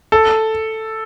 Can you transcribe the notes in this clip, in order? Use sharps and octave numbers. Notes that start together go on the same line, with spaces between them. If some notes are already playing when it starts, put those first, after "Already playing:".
A4